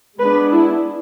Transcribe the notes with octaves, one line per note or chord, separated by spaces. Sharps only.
G#3 B3 D4 B4
E4